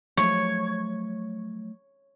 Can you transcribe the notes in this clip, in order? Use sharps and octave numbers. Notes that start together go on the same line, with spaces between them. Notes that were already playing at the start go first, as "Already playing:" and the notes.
F3 F#3 A3 C#5